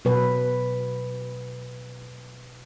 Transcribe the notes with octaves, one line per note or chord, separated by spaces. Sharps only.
B2 F#3 B4